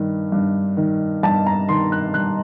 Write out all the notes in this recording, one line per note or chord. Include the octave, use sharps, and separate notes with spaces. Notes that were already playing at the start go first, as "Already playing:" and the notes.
Already playing: G2 D#3
G2
D#3
G2 A5
A#5
D#3 C6
F#6
G2 F#6